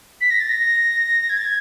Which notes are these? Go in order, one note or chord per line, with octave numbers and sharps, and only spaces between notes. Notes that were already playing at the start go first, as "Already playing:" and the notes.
B6
A#6
A6
A#6
G#6
A6
G#6